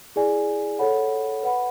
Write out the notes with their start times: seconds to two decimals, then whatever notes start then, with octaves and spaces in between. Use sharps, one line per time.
0.16 E4 G#4 D5 G#5
0.79 A4 C#5 F#5 B5
1.43 B4 F#5 B5